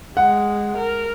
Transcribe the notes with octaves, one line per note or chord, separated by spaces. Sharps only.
G#3 F#5
A#4